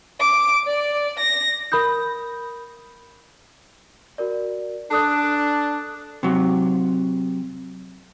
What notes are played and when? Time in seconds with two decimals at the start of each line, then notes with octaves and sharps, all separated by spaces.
0.20 D6
0.67 D5
1.19 A#6
1.72 A#4 B5 D#6 G6
4.18 F#4 A#4 D5
4.91 D4 A4 D5 D#6 F#6
6.23 C3 F#3